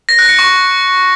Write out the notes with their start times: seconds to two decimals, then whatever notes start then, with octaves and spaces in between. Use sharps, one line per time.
0.09 A#6
0.19 F#6
0.29 C#7
0.39 C#6